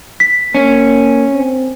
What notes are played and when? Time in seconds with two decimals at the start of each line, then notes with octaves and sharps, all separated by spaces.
0.20 B6
0.55 A#3 C#4
1.33 C4